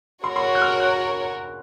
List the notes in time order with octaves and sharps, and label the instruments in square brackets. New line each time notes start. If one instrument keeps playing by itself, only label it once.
[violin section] F#4 A#4 C#5 [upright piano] C6
[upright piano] C6
C#6
F#6
F6
F#6